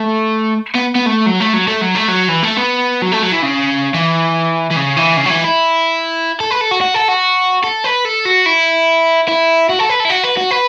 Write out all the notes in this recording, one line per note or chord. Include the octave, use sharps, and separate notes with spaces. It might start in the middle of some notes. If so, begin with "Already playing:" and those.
Already playing: A3
B3
B3
A3
F#3
A3
F#3
A3
F#3
A3
F#3
E3
A3
B3
F#3
A3
F#3
E3
C#3
E3
E3
C#3
E3
C#3
F#3
E3
E4
A4
B4
A4
F#4
F#4
A4
F#4
A4
B4
A4
F#4
E4
E4
F#4
A4
B4
A4
E4
F#4
B4
F#4
B4